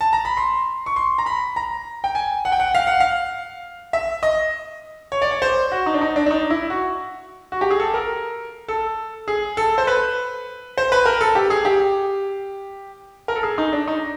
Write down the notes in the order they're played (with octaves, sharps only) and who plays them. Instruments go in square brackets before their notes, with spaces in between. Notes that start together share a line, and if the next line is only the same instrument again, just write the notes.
[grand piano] A5
A#5
B5
C6
C#6
C6
A#5
B5
A#5
G5
G#5
F#5
G5
F#5
F5
F#5
F5
E5
D#5
C#5
D5
C#5
C5
F#4
D#4
D4
D#4
D4
D4
D#4
E4
F#4
F#4
G4
G#4
A4
A#4
A4
G#4
A4
C5
B4
C5
B4
A#4
A4
G4
G#4
G4
A#4
A4
G#4
D#4
D4
D#4